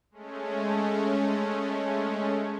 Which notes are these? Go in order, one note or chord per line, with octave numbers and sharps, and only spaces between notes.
G#3 A3 C#4